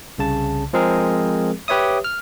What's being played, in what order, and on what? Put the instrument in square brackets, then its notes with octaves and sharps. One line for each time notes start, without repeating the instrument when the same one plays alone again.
[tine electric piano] C2 C#3 A5
F3 G#3 C4 G#4 A#4
G4 B4 C#5 E5 D#6
F6